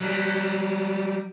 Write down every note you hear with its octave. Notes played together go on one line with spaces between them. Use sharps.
F#3 G3